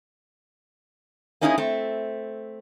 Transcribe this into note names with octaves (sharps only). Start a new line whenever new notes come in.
A#3 C#4 D#4 E4 G4 G#4
A3 C4